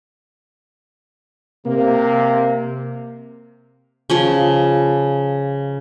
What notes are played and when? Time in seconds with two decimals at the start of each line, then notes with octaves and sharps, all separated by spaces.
1.67 C3 A#3
4.10 C#3 F3 C#5